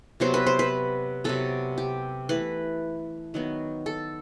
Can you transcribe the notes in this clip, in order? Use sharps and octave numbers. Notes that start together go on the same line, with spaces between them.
C3 F#3 B3 C5
B4
C5
B4
C3 F#3 B3 A4
G4
E3 A3 B4
D#3 F#3 B3
A4